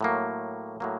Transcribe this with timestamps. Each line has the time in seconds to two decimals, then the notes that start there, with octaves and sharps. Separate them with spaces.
0.01 A2 F#3 A#3
0.80 A2 F#3 A#3